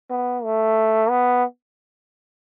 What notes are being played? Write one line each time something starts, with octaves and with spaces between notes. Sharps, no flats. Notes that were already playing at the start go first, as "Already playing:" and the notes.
B3
A3
B3